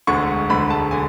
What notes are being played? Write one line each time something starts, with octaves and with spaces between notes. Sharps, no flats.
E1 D2 D3 G#3 C#6
E1 D2 D3 G#3 B5
A5
D3 G#5